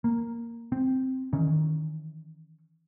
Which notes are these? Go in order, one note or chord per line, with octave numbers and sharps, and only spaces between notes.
A#3
C4
D#3 E3 C#4